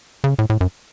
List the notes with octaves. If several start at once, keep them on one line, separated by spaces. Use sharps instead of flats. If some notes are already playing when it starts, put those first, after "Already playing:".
C#3
A2
A2
F#2